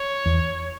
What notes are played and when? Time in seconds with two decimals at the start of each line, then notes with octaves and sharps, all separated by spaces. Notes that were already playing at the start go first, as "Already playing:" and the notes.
Already playing: C#5
0.26 E2